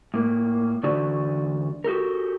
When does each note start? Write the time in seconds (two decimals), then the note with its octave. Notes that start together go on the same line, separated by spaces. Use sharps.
0.14 A2 A#3
0.83 E2 D3 D4 F#4 D5
1.84 F#4 G4 A4 A#4